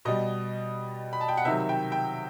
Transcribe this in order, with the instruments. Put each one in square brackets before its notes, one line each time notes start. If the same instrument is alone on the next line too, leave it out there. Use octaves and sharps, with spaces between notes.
[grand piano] B2 G3 D#5
B5
A5
G5
F#5
C3 D#3 F#3 E5
G5
G5